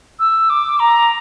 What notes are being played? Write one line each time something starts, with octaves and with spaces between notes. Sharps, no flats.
E6
D6
A#5